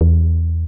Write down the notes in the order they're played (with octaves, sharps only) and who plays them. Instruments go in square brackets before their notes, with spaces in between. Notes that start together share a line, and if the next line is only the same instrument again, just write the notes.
[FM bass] E2